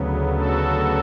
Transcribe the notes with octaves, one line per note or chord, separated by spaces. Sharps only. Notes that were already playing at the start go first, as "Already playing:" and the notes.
Already playing: D2 C#3 F#3 B3
F#4 A4